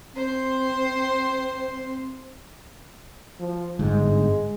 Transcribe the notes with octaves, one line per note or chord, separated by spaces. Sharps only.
C4 C5 C6
F3
G1 G#2 G#3